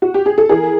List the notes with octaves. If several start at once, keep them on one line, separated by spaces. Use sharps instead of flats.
F#4
G4
G#4
A4
E3 G#4 A#4